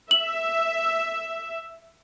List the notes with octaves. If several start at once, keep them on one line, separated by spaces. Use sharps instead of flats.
E5 F#7